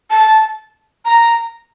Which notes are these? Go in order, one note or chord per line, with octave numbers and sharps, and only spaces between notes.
A5
A#5